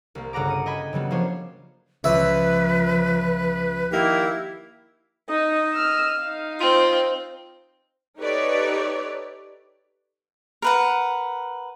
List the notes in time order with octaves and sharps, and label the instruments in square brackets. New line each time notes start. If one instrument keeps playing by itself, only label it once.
[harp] C2 A#3
G1 C#3 F#5 A#5 D6
C#7 D#7
D#5 G5 G#5 B5
C#3 F#3 G3 B3
F3 A#3 C#4 D4 C5 C#5
[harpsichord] C#2 E5 [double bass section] F3 [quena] B4
[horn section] D#3 A#3 G4 [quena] E4
[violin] D#4 [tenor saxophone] D#5
[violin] E6 F6
D#4 F5
[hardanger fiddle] C4 [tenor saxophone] F4
[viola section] D#4 G4 A4 B4 C#5 D5
[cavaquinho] A#4 B4 F#5